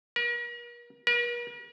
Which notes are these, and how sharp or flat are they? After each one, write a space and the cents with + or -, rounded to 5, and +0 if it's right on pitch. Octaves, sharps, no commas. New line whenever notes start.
A#4 +40
A#4 +45